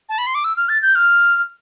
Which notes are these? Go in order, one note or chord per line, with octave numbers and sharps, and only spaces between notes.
A5
B5
C6
D6
E6
F6
A6
G6
F6